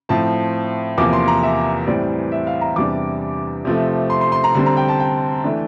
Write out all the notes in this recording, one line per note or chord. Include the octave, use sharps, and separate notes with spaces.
A2 F3 C4 A5
E2 C3 F3 A#3 D6
C6
A#5
E5
A2 E3 G3 C4 D5
E5
F5
A#5
E2 C3 G3 D4 D6
C3 F3 A3 C4
C6
C6
C6
A#5
D3 G3 C4 C6
A#5
G5
A5
G5
E3 A3 D4